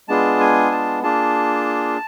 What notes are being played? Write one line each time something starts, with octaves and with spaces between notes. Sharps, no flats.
G#3 B3 D4 F4 G#4 A5
G#5
A5
A#3 D4 F4 G#4 A5